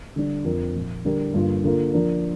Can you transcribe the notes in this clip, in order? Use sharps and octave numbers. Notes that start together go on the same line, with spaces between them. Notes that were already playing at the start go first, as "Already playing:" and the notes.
D3 G3 D4
F2 F3 C4 A#4
A#2 F3 A#3
D3 G3 D4 G4 A#4
G2 D3 A#3 F4
D3 A#3 F4 A#4
F3 D4 A#4